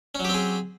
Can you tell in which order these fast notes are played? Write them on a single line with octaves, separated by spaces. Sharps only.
C#4 F#3 G4 C4 G#4